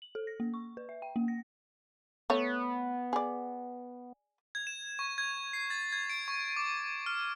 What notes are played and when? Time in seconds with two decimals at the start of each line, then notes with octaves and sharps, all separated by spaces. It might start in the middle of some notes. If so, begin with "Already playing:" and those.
0.02 F#7
0.15 A4
0.27 A#6
0.40 A#3
0.54 C#6
0.77 B4
0.89 E5
1.02 G5
1.16 A#3
1.28 A#6
2.30 A3 B3 C#5
3.13 G#4 D5
4.55 G#6
4.67 E7
4.99 C#6
5.18 G#6
5.53 C7
5.70 A6
5.93 G#6
6.10 D7
6.28 C#6
6.56 D6
7.06 F6